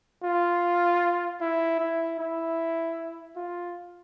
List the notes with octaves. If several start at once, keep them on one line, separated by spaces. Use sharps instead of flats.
F4
E4
E4
E4
F4